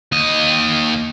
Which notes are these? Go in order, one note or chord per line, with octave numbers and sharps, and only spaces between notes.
D#2 D#5